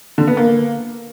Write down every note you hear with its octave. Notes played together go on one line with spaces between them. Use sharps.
D3
B3
A#3